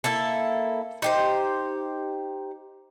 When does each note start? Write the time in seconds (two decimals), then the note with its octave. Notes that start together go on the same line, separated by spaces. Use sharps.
0.04 A#3 E4 A4
1.02 D#4 G4 C5